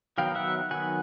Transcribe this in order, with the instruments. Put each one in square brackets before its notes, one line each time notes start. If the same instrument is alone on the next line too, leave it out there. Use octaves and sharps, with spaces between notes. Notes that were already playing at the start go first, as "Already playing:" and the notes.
[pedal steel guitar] D#3 F#3 B3 F5 G5
E5 F#5
D#3 F#3 B3 F#5 G#5